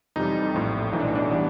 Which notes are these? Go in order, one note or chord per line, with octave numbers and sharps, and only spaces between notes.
F2 C3 E3 G3 D#4
A#1 A2 F3
B1 A2 E3 D#4
D4
D4
E3 G3 B3